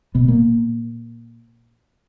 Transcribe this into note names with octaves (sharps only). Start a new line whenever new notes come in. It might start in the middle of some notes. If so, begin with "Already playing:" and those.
B2 B3
A#2 A#3